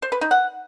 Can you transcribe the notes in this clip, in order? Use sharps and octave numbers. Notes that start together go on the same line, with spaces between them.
C5
B4
D#4
F#5